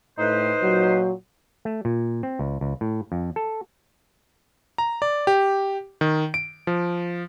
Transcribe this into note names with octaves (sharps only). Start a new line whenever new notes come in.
A2 D#4 B4 C5
A#2 F#3
A3
A#2
C4
C#2
C#2
A2
F2
A4
A#5
D5
G4
D#3
D7
F3